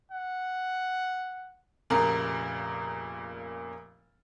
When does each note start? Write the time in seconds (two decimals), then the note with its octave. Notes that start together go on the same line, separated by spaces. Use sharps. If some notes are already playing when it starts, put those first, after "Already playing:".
0.11 F#5
1.90 F1 A#2 C#3 A#4